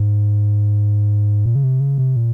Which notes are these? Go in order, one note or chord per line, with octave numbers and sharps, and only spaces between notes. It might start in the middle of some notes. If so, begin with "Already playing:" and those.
Already playing: G#2
A#2
C#3
C3
C#3
C3
A#2